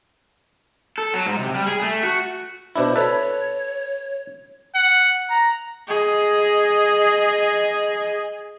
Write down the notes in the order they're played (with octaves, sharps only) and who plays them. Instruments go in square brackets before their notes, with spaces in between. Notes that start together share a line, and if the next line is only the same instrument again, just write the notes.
[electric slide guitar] A4
F#3
G#2
C3
G3
G#4
A3
F#4
[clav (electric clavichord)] B2 D4 E4 [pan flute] C5
[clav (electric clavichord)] A4 B4 [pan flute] C#5
[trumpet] F#5
A#5
[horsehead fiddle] G#4 D#5